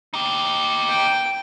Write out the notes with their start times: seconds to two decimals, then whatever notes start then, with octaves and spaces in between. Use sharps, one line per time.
0.14 D#4 G4
0.89 G5